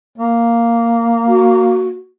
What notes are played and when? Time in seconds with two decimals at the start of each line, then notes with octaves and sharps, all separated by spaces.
0.18 A#3
1.28 F#4